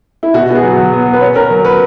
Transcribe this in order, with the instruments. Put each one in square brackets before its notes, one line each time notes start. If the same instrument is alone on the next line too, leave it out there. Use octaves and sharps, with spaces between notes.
[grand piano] E4
[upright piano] B2 [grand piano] F#4
[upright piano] B3 [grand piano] F#4
[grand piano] G#4
[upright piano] F#3
F#3
B3
B3
[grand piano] B4
[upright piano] C#4 [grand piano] C#5
[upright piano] C#4 [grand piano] A#4
[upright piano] F#3
[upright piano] F#3 [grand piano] B4